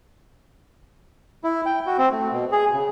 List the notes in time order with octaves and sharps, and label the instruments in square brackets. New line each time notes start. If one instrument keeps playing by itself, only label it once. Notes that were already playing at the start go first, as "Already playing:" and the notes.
[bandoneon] E4
G5
F#4
C4
A3
B2
G#4
C#3